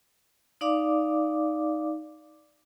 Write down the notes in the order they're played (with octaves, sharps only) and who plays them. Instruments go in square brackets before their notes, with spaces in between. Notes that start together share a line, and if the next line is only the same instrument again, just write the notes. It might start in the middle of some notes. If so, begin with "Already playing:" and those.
[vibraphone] D#4 D5 F5 D6